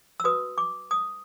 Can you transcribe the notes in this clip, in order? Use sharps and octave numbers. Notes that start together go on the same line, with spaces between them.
E6
F#4 B4 D#6
D6
D#6